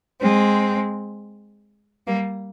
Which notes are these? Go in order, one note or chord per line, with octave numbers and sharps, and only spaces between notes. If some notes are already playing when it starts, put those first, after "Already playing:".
G#3 C4
G3 A#3